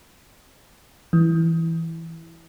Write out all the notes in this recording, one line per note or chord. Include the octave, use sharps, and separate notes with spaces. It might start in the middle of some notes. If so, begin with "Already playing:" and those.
E3